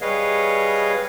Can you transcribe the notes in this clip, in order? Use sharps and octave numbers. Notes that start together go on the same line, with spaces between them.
G3 G#4 B4 C#5 D#5 F5